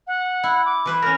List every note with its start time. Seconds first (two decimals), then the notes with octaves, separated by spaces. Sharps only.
0.07 F#5
0.43 E4
0.66 D6
0.86 E3 B4 C5
1.02 C#4 A#4 A#6